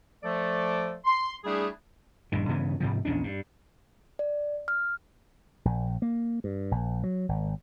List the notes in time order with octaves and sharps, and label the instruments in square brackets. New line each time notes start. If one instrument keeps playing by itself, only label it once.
[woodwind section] F3 A3 A4 D5
C6
G3 A3 D4 E4 G#4
[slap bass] A#1 G2 D#3
G2 C#3 E3 B3
G#2 C3 F3
A#1 E2 C#4 D4
G2
[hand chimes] D5
F6
[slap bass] A#1
A#3
G2
A#1
F#3
G#1